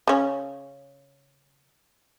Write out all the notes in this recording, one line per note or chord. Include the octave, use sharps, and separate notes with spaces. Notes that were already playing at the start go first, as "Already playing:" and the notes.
C#3 C#4